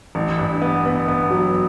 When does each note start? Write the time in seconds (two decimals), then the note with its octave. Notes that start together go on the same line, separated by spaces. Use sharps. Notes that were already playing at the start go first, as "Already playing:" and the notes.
0.15 A1
0.39 G2
0.62 B3
0.85 B3
1.08 B3
1.31 F#3